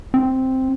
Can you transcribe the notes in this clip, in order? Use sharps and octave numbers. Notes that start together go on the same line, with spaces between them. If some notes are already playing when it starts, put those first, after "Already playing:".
C4